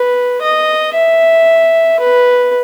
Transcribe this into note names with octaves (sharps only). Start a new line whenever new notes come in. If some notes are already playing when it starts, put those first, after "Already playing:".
Already playing: B4
D#5
E5
B4